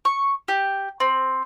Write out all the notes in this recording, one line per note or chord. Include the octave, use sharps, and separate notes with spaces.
C#6
G4
C4